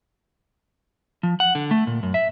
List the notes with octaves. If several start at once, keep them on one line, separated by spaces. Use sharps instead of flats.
F3
F#5
D3
A3
A#2
F#2
E5